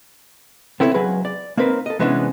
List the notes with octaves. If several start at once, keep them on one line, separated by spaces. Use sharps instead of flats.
B3 C4 E4 A4 A#4 C#5
C#2 F#3 G#4 B4 B5
D5
A#3 C4 D#4 A#4 B4
A4 D#5
C3 E3 G#3 B3 C#4 D4